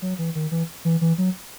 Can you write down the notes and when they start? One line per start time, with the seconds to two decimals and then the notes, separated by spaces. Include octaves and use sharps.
0.02 F#3
0.18 E3
0.35 D#3
0.51 E3
0.85 E3
1.01 E3
1.18 F#3